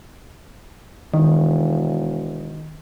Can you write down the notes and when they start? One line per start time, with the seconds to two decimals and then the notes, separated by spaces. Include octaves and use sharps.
1.14 E1 D#3